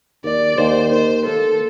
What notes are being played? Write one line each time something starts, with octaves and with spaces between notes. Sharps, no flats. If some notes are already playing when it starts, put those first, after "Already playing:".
D#2 D5
D#2 C5
D#3 C5
A#3 A4